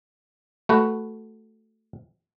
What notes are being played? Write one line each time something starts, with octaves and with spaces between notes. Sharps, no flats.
A3 F#4 B4